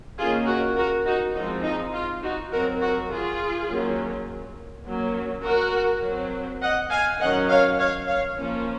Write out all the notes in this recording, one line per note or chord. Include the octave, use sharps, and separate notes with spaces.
D#3 A#3 C#4 F4 G#4
F#4 A#4
F#4 A#4
D#4 F#4
F3 G#3 C4 D#4
D#4
F4
D#4 F#4
F#3 C4 F#4 A#4
F#4 A#4
F4 G#4
D#3 F#3 A#3 C#4
F#3 A#3 C#4
F#4 A#4
F#3 C4
D#5 F#5
F5 G#5
D#3 F#3 C#4 D#5 F#5
C#5 F5
C#5 F5
C#5 F5
F3 A#3 C#4